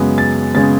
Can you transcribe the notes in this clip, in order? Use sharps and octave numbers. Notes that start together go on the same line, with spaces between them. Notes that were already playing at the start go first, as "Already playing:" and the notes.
Already playing: F#2 C#3 G#3 B3
A6
C#3 G#3 B3 A6